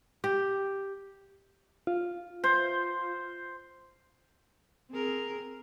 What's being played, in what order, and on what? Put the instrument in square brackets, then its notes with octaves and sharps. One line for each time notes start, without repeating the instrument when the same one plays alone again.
[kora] G4
[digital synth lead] F4
[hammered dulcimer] C5
[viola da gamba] C4 G#4 A#4